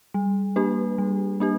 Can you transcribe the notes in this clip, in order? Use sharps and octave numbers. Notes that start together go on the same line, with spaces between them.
G3
A#3 D4 G4 B4
G3
A#3 D4 G4